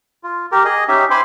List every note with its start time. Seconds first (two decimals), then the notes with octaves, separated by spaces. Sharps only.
0.23 F4
0.52 G4 A#4
0.65 G#4 D#5
0.88 C#4 D#4 G4 E5
1.11 C5 G5 G#5 B5 C6 D6